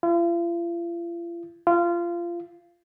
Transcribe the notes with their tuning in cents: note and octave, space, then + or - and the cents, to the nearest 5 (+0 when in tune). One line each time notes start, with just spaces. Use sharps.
F4 -40
F4 -20